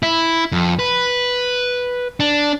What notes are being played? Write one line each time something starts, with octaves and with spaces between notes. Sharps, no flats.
E4
F2
B4
D4